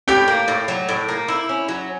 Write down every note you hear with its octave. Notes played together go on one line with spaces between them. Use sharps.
A2 G4 G5
A#3
A2
F#3
A2
A#3
E4
C#4
F#3